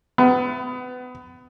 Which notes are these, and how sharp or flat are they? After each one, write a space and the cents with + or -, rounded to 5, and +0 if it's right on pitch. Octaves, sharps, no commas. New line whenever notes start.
B3 +30